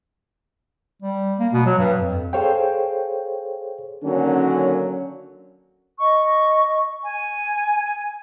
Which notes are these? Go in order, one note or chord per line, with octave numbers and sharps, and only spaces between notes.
G3
A#3
B2
F#3
G2
F2
G#4 A4 C5 C#5 F5 G5
D3 D#3 F#3 A#3 C#4
D#5 C#6
G#5